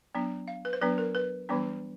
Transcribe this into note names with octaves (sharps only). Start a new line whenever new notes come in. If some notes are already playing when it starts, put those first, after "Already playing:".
F#3 B3 D4
F5
B4
C5
F#3 B3 D4 B4
A#4
B4
E3 G3 B3 D4